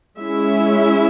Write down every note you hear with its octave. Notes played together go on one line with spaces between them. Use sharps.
G#3 C#4 E4 E5